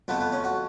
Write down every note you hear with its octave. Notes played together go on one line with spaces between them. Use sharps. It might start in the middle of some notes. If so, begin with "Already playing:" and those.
F2 F3 A3 B3
B3
C#4
F#4